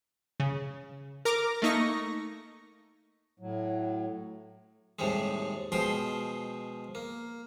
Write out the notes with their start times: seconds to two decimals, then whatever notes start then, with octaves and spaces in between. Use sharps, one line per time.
0.40 C#3
1.25 A#4 A#5 D6
1.62 A3 A#3 D#4 C#6 A#6
3.39 A2 F#3
4.99 D#2 A2 C3 G3 G#3
5.72 B2 F3 G#3 G5 C6
6.95 A#3